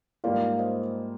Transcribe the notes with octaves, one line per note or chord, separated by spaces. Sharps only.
G#2 G3 A#3 F4 D5 F5
C5 D#5